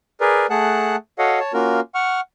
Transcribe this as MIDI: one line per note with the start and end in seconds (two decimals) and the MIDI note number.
0.21 0.46 68
0.21 0.46 70
0.21 0.46 71
0.21 0.46 74
0.50 0.96 57
0.50 0.96 68
0.50 0.96 78
0.50 0.96 81
0.50 0.96 90
1.19 1.39 66
1.19 1.39 69
1.19 1.39 73
1.19 1.39 75
1.19 1.39 77
1.19 1.39 78
1.40 1.52 73
1.40 1.52 81
1.54 1.80 58
1.54 1.80 61
1.54 1.80 65
1.54 1.80 66
1.54 1.80 70
1.95 2.20 78
1.95 2.20 85
1.95 2.20 89